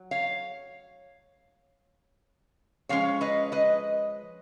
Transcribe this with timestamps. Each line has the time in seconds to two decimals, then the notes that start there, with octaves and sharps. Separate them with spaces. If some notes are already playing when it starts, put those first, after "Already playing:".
Already playing: F#3
0.11 C#5 F5
2.89 F3 G#3 C#4 C#5 F5
3.21 B4 D#5
3.52 B4 D#5